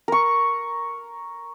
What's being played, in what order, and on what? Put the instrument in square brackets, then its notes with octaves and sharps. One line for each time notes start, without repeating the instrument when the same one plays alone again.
[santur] A#4 C#6